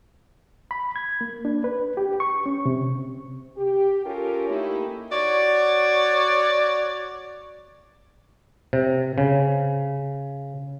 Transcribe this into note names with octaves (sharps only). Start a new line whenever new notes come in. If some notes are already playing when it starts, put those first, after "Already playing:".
B5
G#6
A#3
D4
B4
G4
C#6
C#4
C3
G4
C#4 F4 G4 A4 A#4
A3 A#3 D#4 E4 G4
F#4 C#5 D5
C3
C#3